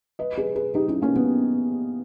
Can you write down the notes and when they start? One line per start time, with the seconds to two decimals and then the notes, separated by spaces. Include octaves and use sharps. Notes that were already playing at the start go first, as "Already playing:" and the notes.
0.19 B4 D#5
0.38 G#4 B4
0.55 G#4 B4
0.75 D#4 G4
0.88 C#4 E4
1.02 A#3 C#4
1.16 B3